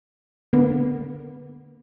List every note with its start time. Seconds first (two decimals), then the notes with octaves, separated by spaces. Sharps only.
0.53 D3 A#3 B3